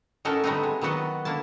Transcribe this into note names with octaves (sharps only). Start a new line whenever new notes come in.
A2 C#4 D#4 F#4 A4 A#4
D3 G3 A3 B3 C4 D#4
G#3
D#3 F#3 B3 F#4 D5 D#5
D3 A#3 E4 A5